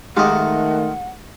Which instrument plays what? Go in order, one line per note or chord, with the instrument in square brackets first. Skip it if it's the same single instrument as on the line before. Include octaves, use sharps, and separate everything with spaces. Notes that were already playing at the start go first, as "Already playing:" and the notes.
[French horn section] D#3 A3 [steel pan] G#3 D#4 G4 [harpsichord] F4 D#5 [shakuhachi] F#5